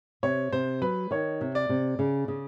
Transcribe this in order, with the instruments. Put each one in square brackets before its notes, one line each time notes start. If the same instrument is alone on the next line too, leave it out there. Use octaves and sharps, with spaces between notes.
[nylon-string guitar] C3 [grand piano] C#5
[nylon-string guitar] C3 [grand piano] C5
[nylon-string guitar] F#3 [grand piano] B4
[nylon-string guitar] D#3 [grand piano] C#5
[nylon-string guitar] C3
[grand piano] D5
[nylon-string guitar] C3
C#3
C#3